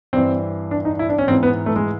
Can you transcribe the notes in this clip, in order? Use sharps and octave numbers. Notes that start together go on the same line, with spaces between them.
G2 E3 C4
D4
D#4
E4
D4
C#4
G#2 E3 C4
B3
A3
G#3